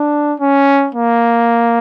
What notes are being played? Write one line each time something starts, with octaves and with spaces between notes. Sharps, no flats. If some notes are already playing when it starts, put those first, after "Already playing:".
Already playing: D4
C#4
A#3